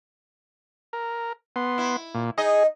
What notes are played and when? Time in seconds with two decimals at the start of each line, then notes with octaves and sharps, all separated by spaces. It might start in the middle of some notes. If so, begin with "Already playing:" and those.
0.93 A#4
1.56 B3 C6
1.78 E4
2.15 A#2
2.38 D#4 G#4 D#5